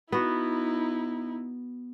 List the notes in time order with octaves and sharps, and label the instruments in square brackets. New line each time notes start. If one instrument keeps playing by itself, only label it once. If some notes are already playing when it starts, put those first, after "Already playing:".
[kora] B3 F#4 [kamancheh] D#4 E4